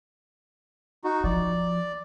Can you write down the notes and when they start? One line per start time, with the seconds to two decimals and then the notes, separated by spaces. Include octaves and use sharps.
1.04 D#4 F#4
1.24 F3 D5